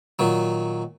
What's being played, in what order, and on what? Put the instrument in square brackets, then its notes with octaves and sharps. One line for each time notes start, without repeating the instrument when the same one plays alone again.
[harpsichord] A#2 D#3 F#3